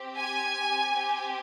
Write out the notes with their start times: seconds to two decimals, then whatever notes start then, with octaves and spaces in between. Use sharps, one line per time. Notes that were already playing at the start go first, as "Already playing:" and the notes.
Already playing: C4 G4
0.17 G#5
0.94 C4 G4